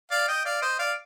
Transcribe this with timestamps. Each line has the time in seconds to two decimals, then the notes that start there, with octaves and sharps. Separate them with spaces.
0.11 D5 F5
0.28 D#5 G5
0.45 D5 F5
0.62 C5 D#5
0.79 D5 F5